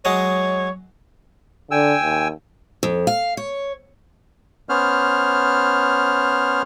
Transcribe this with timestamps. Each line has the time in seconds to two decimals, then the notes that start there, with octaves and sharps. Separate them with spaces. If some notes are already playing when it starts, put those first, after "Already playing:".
0.05 F#3 G#3 C#5 D#5
1.71 D3 G5 G#5 E6
2.03 D#2
2.83 F2
3.07 F5
3.37 C#5
4.69 B3 C#4 C5 F6